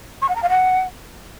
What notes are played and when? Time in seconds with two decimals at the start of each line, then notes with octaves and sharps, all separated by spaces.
0.22 C#6
0.29 F#5
0.36 A#5
0.42 F5
0.49 F#5